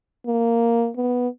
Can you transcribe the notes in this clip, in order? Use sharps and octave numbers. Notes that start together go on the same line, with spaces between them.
A#3
B3